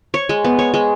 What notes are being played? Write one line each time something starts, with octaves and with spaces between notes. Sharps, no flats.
C#5
G#3
B3
C#5
G#3